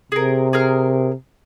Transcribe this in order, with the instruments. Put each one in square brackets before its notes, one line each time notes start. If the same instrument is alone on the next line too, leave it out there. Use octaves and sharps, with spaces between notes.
[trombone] C3 [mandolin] G#4 A#4
[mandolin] G#4 A#4 F6